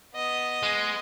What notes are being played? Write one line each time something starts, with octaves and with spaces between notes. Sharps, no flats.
B3 D#5
G#3